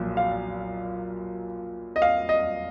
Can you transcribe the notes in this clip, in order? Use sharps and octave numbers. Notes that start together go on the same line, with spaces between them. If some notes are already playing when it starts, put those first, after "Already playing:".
Already playing: B1 A#2 F3
F5
D#5
F5
D#5